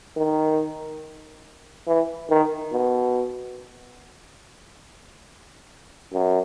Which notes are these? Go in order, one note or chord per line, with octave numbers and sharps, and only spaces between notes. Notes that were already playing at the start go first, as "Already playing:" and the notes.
D#3
E3
D#3
B2
F#2